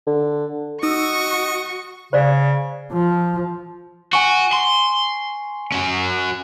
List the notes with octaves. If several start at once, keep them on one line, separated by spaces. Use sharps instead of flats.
D3
D#4 F#4 D#5 C#6 E6
C#3 C5 D5 F5
F3
F#4 G#5 C#6
C6
C#4 F#4